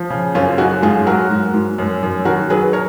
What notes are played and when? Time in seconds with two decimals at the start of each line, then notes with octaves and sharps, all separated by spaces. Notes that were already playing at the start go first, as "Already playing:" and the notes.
Already playing: F3
0.10 C#3
0.35 F#2 C#4 F4
0.58 F#2 D#4 F#4
0.82 G#2 F4 G#4
1.06 F#3 F#4 A#4
1.30 G#2
1.54 G#2
1.78 F#2
2.03 F#2
2.25 D#3 F#4 A#4
2.50 F#3 G#4 B4
2.73 A#4 C#5